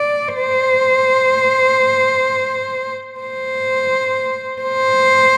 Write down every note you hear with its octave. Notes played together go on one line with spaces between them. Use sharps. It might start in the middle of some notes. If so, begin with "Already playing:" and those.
Already playing: D5
C5
C5
C5